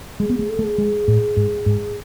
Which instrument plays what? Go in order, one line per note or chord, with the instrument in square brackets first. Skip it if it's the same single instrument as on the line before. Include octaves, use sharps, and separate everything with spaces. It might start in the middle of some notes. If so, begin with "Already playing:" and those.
[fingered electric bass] G#3 [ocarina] G#4
[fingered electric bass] B3
[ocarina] G#4
[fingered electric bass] A3
[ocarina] A4
[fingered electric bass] A3
[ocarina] G#4
[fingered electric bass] G#3
A2
G#2
G#2